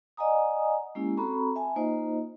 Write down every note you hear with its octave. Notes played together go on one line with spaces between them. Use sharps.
D5 D#5 F#5 G#5 A#5 D#6
G#3 A#3 C#4 E4 G4
C4 F#4 A4 A#5 B5 C#6
E5 G#5 A5
A#3 D#4 F4 C5 D#5